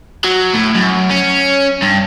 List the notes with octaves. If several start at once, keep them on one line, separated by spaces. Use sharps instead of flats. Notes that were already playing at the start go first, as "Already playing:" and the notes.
F#3
A2
F#2
C#4
G2